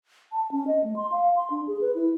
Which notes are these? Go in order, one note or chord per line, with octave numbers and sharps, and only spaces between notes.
A5
C#4
D#5
A3
C6
F5
C6
D4
G#4
B4
E4